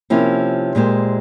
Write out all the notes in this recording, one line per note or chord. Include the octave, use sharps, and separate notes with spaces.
C3 F3 A#3 C#4 E4
A#2 G#3 E4 G4 C5